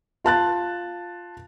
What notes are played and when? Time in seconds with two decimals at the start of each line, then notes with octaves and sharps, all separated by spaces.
0.24 F4 A5 F#6 A6